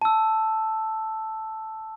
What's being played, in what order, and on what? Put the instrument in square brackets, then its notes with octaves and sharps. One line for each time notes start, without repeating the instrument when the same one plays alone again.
[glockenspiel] A5 E6